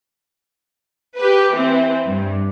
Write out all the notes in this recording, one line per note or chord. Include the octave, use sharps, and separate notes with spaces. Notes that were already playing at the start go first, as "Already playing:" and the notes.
G4 B4
E3 C4
G2